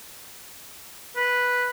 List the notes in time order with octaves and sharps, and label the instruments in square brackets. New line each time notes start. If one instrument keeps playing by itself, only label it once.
[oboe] B4